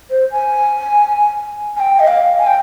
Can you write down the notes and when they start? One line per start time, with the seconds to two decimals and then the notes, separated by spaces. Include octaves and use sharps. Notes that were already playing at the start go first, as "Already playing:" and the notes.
0.10 C5
0.32 G#5
1.76 G#5
1.80 G5
2.00 D#5
2.07 F5
2.39 G#5
2.47 G5